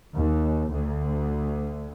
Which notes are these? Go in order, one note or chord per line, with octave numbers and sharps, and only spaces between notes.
D#2
D2